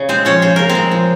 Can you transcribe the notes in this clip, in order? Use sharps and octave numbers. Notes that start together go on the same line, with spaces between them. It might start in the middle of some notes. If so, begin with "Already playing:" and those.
Already playing: C#3
G#3 C4 C5
F3 C#4 C#5
C#3 C5
C#3 A#4
C4 C5
G#3
F3